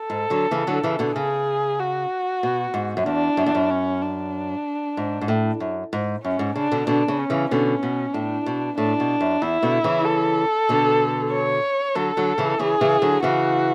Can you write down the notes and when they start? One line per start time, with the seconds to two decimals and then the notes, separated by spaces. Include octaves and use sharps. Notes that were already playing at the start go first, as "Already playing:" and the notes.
Already playing: A4
0.10 G#2
0.30 D3 F#3
0.51 C#3 E3
0.67 D3 F#3
0.83 C#3 E3
0.99 B2 D3
1.15 C#3 G#4
1.80 F#4
2.43 B2
2.74 G#2
2.97 F#2
3.06 E2 D4
3.37 F#2
3.46 E2
3.55 F#2
3.70 C#4
4.02 D4
4.97 G#2
5.21 G#2
5.28 A2
5.60 F#2
5.93 G#2
6.24 F#2 C#4
6.39 G#2
6.55 C#3 D4
6.71 B2 D3
6.87 B2 D3 D4
7.08 C#3
7.19 C#4
7.30 C#3 E3
7.51 B2 D3 C#4
7.83 B2
8.14 A2 D4
8.46 B2
8.78 A2 D4
9.00 B2
9.21 F#2
9.42 E2 E4
9.63 B2 D3
9.84 C#3 E3
10.05 A4
10.69 B2 D3
11.33 C#5
11.95 D3 F#3 A4
12.17 D3 F#3
12.38 C#3 E3
12.59 C#3 E3 G#4
12.81 C#3 E3
13.02 D3 F#3
13.23 C#3 E3 F#4